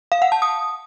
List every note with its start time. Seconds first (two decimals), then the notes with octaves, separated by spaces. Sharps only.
0.12 F5
0.22 F#5
0.32 A5
0.42 D#6